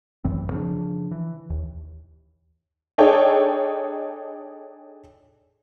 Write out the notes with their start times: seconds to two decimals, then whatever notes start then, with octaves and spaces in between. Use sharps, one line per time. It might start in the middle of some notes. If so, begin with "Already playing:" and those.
0.24 A1 F#2 E3 C4
0.50 C#3 F3 D4
1.11 E3
1.50 D#2
2.98 D4 D#4 G#4 A4 C#5 G5